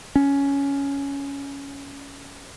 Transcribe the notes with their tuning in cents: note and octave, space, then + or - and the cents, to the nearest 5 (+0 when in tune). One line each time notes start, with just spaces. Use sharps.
C#4 +10